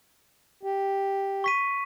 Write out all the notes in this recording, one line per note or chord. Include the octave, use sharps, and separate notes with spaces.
G4
C#6 B6 D#7